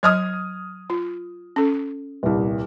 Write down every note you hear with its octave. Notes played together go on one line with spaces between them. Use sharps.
F#3 D#5 D#6 F6 G#6
F4
C#4 A4
D#1 C2